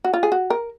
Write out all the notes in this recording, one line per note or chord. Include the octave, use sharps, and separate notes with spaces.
F#4
F4
G#4
F#4
A#4